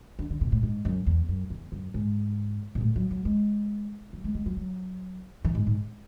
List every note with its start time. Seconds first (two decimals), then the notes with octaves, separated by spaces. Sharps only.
0.19 D3
0.30 D3
0.41 B2
0.52 A2
0.63 G#2
0.85 F#2
1.06 E2
1.28 F#2
1.50 E2
1.72 F#2
1.94 G#2
2.75 B2
2.81 A2
2.96 F#3
3.11 F#3
3.25 G#3
4.13 F#3
4.24 G#3
4.35 G#3
4.46 F#3
4.57 F#3
5.45 E3
5.55 G#2
5.66 G#2